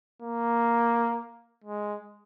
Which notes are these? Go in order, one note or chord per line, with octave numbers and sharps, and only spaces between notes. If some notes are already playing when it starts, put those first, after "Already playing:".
A#3
G#3